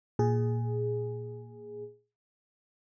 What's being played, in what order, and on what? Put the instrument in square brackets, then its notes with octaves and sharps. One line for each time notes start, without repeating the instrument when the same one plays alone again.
[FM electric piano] A#2 G#4